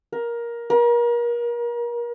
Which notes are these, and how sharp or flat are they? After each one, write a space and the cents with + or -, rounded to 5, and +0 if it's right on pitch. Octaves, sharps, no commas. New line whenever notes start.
A#4 +15
A#4 +35